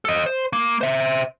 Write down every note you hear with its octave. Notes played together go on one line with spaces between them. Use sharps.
A4 D#5
C5
A#3
C5 E5